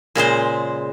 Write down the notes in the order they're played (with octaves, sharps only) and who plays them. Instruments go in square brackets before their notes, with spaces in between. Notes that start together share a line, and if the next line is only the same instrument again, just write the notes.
[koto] A#2 C#3 G#3 C5